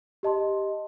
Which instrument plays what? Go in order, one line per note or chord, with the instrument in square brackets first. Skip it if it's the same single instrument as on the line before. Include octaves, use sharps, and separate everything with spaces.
[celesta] G4 D#5 A5 C6